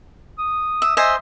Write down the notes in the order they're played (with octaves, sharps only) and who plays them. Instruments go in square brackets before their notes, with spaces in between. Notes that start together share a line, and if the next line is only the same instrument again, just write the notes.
[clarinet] D#6
[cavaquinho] E5
[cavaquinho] C5 D#5 G#5 [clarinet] E5